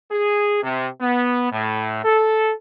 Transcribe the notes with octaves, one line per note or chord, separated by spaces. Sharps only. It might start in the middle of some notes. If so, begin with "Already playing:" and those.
G#4
C3
B3
A2
A4